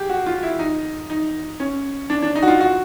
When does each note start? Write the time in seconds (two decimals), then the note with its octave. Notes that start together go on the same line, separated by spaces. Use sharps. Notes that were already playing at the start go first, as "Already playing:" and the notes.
Already playing: G4 G#4
0.09 F#4
0.26 F4
0.43 E4
0.59 D#4
1.10 D#4
1.60 C#4
2.10 D4
2.22 D4
2.35 D#4
2.43 F#4
2.48 F4
2.60 F#4